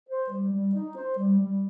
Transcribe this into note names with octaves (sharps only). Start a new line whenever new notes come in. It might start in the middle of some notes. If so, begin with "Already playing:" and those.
C5
G3
G3
D#4
C5
G3
G3